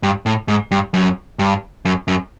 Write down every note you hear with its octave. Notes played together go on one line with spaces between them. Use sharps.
G2
A2
G#2
G2
F#2
G2
F#2
F#2